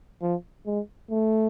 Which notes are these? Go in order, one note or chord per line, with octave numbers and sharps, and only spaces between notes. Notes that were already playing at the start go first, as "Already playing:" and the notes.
F3
G#3
A3